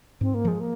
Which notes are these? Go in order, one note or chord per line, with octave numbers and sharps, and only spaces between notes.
G#2 C4
A#3
F3 G#3
A#3